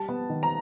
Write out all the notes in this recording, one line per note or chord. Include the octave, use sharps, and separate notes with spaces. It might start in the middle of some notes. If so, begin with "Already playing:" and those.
Already playing: G3 A5
B3
D#3
A#5